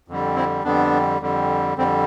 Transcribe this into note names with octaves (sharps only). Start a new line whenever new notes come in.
F2 D3 G3
C4 E4
F2 D3 G3 B3 D4
F2 D3 G3
F2 D3 G3 C4